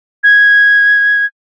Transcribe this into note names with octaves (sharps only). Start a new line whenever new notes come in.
G#6